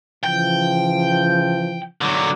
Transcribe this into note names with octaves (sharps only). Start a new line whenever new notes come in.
C#3 E3 F3 G5
D3 F#3